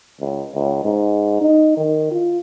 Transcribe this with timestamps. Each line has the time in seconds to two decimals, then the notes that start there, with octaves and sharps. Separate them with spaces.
0.20 C#2
0.55 C#2
0.84 G#2
1.41 D#4
1.77 D#3
2.12 F4